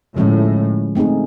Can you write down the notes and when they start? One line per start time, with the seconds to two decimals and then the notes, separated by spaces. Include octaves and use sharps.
0.17 A2 D3 F3 G#3 C#4 E4
0.95 A3 C4 D#4 G#4